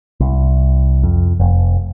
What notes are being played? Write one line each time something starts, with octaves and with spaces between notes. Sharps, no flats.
C2
F2
F1